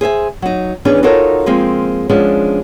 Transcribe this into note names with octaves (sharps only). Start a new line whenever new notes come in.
G#4 C5 E5 G#5
F#3 D#4
E3 B3 C#4 D4 G#4 B4
D#4 F4 F#4 A4 A#4 C#5
F3 G#3 A#3 C4
F3 G#3 B3 C#4 D4